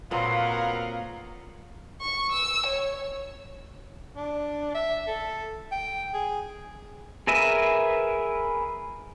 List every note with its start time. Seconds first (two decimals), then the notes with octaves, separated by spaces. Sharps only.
0.11 A#2 F#3 B3 C4 A4 A#4 F5
2.01 C#6
2.32 E6
2.66 C#5
4.16 D4
4.74 E5
5.07 A4
5.72 G5
6.14 G#4
7.27 G#4 A#4 B4 E5 G#5